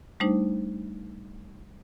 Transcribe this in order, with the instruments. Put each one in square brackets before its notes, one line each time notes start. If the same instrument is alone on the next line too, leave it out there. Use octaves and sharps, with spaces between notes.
[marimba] G3 A3 D4 D#4 C5